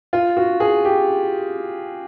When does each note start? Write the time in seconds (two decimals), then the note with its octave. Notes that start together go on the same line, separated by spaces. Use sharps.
0.13 F4
0.37 F#4
0.60 G#4
0.85 G4